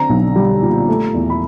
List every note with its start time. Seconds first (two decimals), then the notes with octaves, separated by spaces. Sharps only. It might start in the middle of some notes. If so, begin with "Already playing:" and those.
Already playing: D3 C4 A#5
0.09 B1
0.36 G3
0.62 A#2
0.89 A3
1.15 E2
1.30 B5